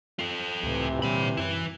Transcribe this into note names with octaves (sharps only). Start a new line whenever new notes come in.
F4 A4
C#2 A2 C3 E3
A#2 D3 G3 C#5 B5
F#2 E4 B4